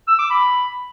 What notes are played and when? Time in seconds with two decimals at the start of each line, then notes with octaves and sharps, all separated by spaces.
0.07 E6
0.19 D6
0.30 B5